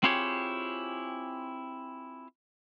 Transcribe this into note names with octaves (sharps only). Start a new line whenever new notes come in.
C4 E4 F4 G4 G#4 C#5